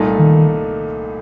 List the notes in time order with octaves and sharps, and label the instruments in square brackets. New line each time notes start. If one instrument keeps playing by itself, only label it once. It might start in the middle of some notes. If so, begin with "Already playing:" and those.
Already playing: [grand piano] C2 A#2 A3 D#4
[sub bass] D#3